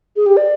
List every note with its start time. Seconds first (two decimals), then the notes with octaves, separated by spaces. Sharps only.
0.16 G#4
0.26 G4
0.37 D5